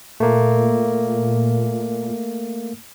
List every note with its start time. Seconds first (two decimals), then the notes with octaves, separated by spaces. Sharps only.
0.20 A#2 A3 A#3